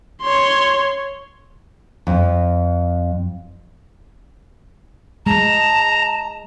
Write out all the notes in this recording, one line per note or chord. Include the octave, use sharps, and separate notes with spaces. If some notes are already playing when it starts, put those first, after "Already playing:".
C#5 C6
F2
G#3 A5 A#5